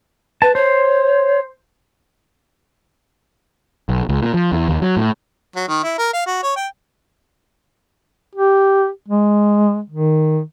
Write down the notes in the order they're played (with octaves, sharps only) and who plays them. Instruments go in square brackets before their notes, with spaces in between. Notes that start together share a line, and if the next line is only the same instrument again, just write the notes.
[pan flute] B4 [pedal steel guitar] A5
[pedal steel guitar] C5 [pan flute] C#5
[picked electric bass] B1
C#2
A#2
F3
E2
D#2
F#3
A2
[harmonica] F#3
D#3
E4
A#4
F5
F#4
C#5
G5
[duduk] G4
G#3
D#3